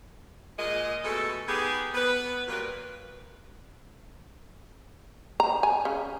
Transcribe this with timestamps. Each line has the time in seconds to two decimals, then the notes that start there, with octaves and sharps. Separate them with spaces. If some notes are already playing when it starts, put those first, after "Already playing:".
0.58 A#2 G#3 D#5
1.04 B2 G#3 A3 G#4 A4
1.48 B3 D#4 G4 G#4
1.94 B3 B4
2.48 A#2 F#3 G3 F4 A#4 B4
5.40 A#5
5.63 G#5
5.85 C#3